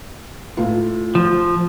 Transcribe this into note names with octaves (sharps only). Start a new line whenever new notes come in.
A2 F4
F3